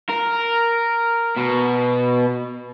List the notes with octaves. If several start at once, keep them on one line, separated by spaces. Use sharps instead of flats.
A#4
B2